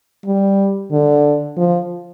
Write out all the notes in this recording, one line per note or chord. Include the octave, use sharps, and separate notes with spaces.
G3
D3
F3